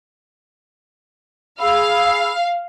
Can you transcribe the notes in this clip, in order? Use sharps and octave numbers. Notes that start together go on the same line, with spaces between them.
G#4 F5 B5 E6